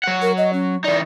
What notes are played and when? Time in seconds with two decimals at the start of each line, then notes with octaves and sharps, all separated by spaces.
0.04 F#3 F#5
0.22 A#4
0.38 D#5
0.53 C#4
0.84 E3 D#4 D5